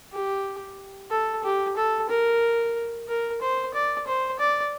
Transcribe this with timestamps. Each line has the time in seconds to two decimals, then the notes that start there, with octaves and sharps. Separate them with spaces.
0.13 G4
1.11 A4
1.44 G4
1.76 A4
2.09 A#4
3.08 A#4
3.41 C5
3.74 D5
4.07 C5
4.39 D5